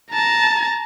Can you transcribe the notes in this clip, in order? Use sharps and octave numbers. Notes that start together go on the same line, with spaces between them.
A5 A#5